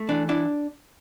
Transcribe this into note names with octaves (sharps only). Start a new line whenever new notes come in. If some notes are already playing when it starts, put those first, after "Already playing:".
Already playing: A3
E3 D4
D4 E4